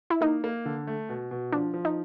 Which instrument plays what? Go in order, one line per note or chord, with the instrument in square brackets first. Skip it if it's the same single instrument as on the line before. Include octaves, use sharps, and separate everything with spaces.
[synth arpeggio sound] E4
[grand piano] A#3 [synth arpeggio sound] D#4
[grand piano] A#3
D3
A3
B2
B2
[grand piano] F3 [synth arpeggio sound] D4
[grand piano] F3
[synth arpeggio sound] D#4